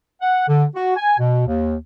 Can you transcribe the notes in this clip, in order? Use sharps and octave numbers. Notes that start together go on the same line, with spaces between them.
F#5
D3
F#4
G#5
B2
D#2